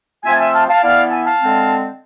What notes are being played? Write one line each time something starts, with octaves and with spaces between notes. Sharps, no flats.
F3 A3 C4 F4 E5 G#5
A5
E5 G#5
F5 A5
F5 A5
E3 B3 E4 D5 F5
A5
E5 G#5
F5 A5
D3 G#3 C4